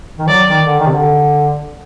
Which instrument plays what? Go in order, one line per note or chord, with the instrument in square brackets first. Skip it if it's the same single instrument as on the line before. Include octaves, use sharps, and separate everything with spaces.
[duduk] D#3
[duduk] F#3 [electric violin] D5
[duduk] D#3
D3
D#3
C3
D3